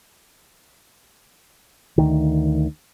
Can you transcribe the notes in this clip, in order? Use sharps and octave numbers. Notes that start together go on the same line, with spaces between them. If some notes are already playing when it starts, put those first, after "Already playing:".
D2 D#3